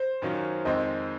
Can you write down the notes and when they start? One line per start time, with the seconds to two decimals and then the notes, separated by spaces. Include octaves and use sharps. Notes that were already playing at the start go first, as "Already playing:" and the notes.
Already playing: C5
0.22 F#2 D#3 F#3 C#4 F4
0.65 F2 D#3 G#3 C4 D#5